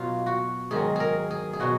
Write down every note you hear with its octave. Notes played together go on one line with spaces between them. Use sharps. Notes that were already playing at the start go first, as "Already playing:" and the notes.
Already playing: B2 F#3 F4
F#4
G#2 D#3 F#3 G#4
G#4 A#4
G#4
G#4
B2 F#3 F#4